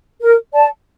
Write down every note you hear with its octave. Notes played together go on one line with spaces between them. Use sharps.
A#4
D5 A5